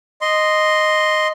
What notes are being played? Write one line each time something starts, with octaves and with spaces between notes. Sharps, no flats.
D#5 C6